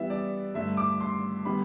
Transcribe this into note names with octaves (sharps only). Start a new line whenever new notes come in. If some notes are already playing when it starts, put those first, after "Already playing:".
Already playing: E3 G3 B3 E4 E5
D5
G2 D3 A3 E5
D6
C6
D3 G3 B3 B5